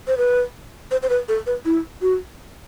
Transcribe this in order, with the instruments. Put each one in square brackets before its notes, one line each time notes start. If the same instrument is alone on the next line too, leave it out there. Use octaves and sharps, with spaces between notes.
[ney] C5
B4
C5
C5
B4
A4
B4
E4
F#4